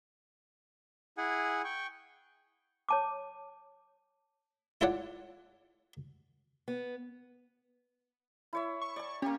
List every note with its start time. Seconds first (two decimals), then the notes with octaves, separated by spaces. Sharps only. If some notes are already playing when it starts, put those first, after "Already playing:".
1.18 E4 G#4 F#5 G#5
1.64 G5 C#6
2.89 C#5 A5 D6
4.81 E4 F4 A4 C#5 D5 F#5
6.68 B3
8.53 E4 C#5 E5
8.82 C#6
8.96 D5 A5
9.22 A#3 C#4 G4